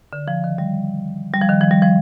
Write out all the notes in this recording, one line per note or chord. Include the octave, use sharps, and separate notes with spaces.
D3
F3
D#3
G3
G3
F3
D#3
F3
G3
F3